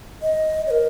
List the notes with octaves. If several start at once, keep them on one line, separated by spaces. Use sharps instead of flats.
D#5
C#5
A#4